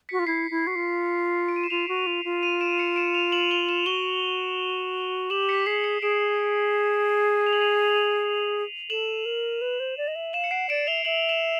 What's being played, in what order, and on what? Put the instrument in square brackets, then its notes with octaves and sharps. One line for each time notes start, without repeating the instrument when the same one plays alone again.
[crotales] B6 C#7
[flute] F#4
F4
[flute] E4 [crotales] C7
[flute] E4
F#4
F4
[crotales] D7
D#7
E7
[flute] F4 [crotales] D#7 F7
[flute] F#4
F4
F4
[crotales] D#7 F7
D7 E7
C#7 D#7
D7 E7
D#7 F7
E7 F#7
F7 G7
E7 F#7
[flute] F#4 [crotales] F7 G7
[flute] G4 [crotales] E7 F#7
[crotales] B6 C#7
[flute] G#4 [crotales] C7
[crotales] B6 C#7
[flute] G#4 [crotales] D7 E7
[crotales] F7
F#7
D#7 F7
[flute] A4 [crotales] E7 F#7
[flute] A#4
B4
C5
D5
D#5
E5
[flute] F5 [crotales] E7 F#7
[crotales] C#7
[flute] F#5 [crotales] C7 D7
[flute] D5 [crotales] D7 E7
[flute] E5 [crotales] F7 G7
[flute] E5 [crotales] E7 F#7
[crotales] E7 F#7